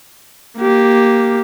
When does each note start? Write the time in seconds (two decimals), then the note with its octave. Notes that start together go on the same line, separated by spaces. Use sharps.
0.58 A#3 G4